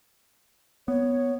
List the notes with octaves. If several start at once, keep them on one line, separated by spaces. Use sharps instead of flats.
B3 C#5